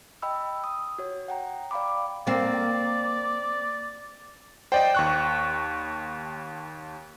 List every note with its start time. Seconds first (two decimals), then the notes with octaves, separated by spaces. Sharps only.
0.22 D#5 G5 B5 E6
0.64 D#6
0.98 F#4 C#5
1.28 F#5 G5 A#5
1.71 D5 F5 G5 B5 D6
2.27 A#3 C4 D5
4.72 C5 D5 D#5 G5
4.95 D#2 C#6 F#6